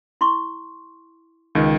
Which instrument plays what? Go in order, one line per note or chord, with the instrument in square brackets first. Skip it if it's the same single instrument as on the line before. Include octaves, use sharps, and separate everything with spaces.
[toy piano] E4 C6 C#6
[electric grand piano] C#2 D#3